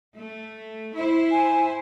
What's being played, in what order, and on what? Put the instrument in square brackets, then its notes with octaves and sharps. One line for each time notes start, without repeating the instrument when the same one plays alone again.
[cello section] A3
E4 C5
[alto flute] G#5